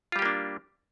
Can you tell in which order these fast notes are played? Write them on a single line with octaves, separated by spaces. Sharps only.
F4 G3 G4 A#3 D4